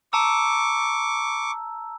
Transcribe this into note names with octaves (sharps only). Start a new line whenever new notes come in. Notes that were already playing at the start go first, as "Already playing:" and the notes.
A5 A#5 C#6 D6 E6